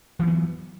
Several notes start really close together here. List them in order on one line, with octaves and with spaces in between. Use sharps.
E3 F#3 B3